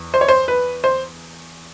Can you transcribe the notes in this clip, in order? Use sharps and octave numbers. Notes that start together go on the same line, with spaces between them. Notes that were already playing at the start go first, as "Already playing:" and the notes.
Already playing: E2
C5
C#5
C5
B4
C5